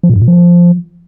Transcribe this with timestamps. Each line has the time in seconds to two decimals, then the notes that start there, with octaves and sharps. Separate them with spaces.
0.03 F3
0.09 A#2
0.16 G2
0.22 A#2
0.28 F3